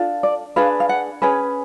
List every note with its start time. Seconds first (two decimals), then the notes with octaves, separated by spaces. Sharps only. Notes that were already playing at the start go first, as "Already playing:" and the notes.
Already playing: D4 F4 A4
0.23 D5
0.56 D4 G#4 B4 F5
0.80 F5
0.89 F#5
1.22 C#4 G#4 B4 G#5